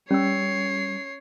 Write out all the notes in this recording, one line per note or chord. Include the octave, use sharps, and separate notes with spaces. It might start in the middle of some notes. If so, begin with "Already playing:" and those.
G3 C#4 C#5 E6 C7